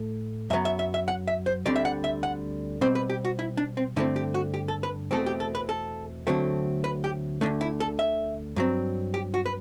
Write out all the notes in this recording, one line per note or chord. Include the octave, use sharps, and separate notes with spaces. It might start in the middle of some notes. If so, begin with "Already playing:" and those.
Already playing: A2 A3
F#2 F#3 B3 E5
E5
E5
E5
F#5
E5
C5
D2 D3 G3 C4 D5
E5
F#5
E5
F#5
B2 G3 C4 C5
B4
G4
F#4
E4
D4
C4
G2 D3 A3 C4 E4
G4
F#4
G4
A4
B4
E2 B2 A3 C4 A4
G4
A4
B4
A4
D2 D3 F#3 A3 C4
B4
G4
D2 D3 A3 D4
E4
A4
E5
G2 F#3 C4
G4
F#4
B4